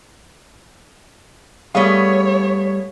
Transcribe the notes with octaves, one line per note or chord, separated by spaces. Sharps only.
G3 A3 B3 G#4 C#5 F5